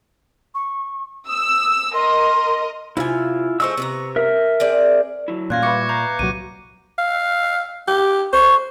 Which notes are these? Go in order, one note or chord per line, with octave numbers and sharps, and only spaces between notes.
C#6
D#6 E6
A#4 D#5 C6
C3 E4 F4 G#5
G#3 A3 C5 C#6 E6
C3 B3 A#5
A#4 E5
C4 G#4 D5
F#3 E4
A#2 E3 G3 C#4 F4 F#6 G#6 A#6
G3 B4 E5 C#6 D6 A#6 C#7
F5 A#5 G6
C2 A#2 F#3 D#7
F5
G4
C5 C#6